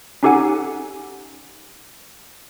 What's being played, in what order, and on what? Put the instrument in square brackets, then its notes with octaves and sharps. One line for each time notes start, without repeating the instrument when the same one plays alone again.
[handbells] C#4 D#4 G4 A4 F#5 G#5